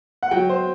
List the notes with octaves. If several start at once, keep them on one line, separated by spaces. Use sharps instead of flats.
F#5
F#3 G5
C5